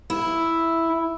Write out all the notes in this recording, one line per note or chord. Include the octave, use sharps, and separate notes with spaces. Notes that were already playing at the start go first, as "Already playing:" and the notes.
E4